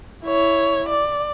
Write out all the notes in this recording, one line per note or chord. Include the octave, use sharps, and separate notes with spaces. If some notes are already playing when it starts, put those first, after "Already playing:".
E4 C#5
D5